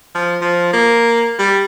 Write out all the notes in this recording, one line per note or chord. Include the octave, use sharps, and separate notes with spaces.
F3
F3
A#3
G3